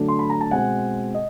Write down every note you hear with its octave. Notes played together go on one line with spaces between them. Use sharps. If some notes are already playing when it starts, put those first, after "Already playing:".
Already playing: D3 F#3 A3 D4
C6
B5
A#5
A5
B2 G#3 C4 F#5 G#5
D#5